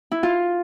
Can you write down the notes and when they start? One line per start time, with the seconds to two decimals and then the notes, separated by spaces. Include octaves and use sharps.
0.11 E4
0.23 F4